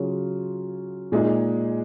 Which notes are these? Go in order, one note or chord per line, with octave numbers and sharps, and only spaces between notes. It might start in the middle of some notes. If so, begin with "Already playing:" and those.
Already playing: C#3 F#3 C#4 F4 G#4
A#2 G#3 D#4 G#4